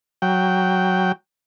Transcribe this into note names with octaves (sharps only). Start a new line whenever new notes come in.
F#3 G5